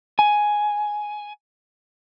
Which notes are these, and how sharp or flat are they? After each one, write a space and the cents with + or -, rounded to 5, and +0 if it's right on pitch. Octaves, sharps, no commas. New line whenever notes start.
G#5 +5